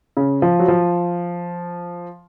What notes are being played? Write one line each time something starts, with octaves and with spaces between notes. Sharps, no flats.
C#3
F3
F#3
F3